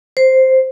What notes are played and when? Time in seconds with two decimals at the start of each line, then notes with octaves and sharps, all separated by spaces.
0.17 C5